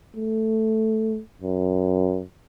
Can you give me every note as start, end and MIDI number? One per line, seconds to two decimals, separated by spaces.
0.16 1.20 57
1.41 2.23 42